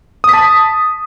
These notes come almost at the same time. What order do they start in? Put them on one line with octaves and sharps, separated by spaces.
D#6 B6 A5